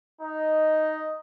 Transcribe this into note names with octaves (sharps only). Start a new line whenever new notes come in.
D#4 D#5